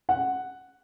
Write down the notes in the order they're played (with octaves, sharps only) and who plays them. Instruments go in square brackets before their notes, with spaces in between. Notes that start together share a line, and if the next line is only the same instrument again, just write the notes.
[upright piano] F#5